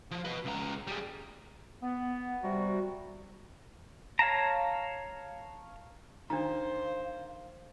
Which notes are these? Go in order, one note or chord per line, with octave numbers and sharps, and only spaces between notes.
F3
B4 D#5
C#2 A#5
G3 G#4
B3
C3 G3 F#4
C#5 F5 A5 A#5
D#3 D4 C5 F5 A#5